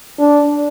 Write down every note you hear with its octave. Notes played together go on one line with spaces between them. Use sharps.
D4